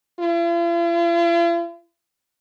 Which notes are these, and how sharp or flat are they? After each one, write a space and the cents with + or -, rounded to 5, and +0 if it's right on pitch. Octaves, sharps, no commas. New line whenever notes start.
F4 -45